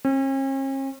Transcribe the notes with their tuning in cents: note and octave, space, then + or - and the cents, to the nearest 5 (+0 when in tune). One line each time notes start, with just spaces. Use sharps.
C#4 -45